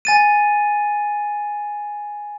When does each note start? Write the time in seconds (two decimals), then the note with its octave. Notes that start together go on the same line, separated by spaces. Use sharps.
0.05 G#5 A6 D#7